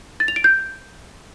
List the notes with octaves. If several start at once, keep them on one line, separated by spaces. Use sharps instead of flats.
A6
F7
D7
G6